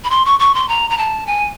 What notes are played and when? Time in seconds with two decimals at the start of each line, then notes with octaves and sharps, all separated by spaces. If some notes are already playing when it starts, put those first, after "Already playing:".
0.04 B5
0.10 C6
0.25 C#6
0.40 C#6
0.55 C6
0.69 A#5
0.90 A#5
0.98 A5
1.27 G#5